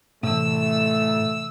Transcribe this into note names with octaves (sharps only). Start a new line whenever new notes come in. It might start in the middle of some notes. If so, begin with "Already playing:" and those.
A2 C3 E3 A3 E6